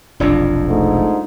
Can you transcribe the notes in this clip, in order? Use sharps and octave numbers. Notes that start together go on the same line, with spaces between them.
F1 B1 F2 D4 F4 D5
G#2 A3